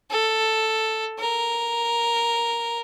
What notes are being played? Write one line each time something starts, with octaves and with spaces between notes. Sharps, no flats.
A4
A#4